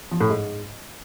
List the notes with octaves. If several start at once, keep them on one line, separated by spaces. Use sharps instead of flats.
F3
A2
G#2